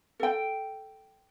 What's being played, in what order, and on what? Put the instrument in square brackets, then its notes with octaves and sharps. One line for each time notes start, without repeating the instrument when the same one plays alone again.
[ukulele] A4 G5